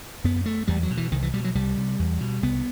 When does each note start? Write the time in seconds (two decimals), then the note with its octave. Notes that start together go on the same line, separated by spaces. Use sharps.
0.24 F#2 B3
0.46 A3
0.68 E2 G3
0.83 F#3
0.90 B2
0.97 E3
1.12 C2 D#3
1.22 E3
1.33 B2 G3
1.44 F#3
1.55 C2 G3
1.77 C3
1.99 E2
2.21 B2
2.43 C2 B3